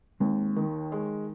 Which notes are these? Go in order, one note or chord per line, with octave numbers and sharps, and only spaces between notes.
D#2 G#3 C4
D#3
G#3